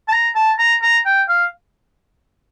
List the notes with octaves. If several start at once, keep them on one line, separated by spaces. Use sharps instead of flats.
A5
A#5
A5
A#5
A#5
G5
F5